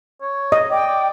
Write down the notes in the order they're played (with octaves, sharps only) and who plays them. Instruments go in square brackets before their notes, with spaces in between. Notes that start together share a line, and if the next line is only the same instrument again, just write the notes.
[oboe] C#5
[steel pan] D#5
[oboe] D5 [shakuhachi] G5
[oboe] D5